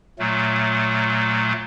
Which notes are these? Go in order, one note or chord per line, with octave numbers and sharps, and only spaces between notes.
A#2 F#3 A3